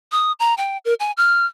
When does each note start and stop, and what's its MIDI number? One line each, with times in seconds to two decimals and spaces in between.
0.12 0.32 87
0.40 0.54 82
0.57 0.78 79
0.85 0.94 70
1.00 1.12 80
1.17 1.46 89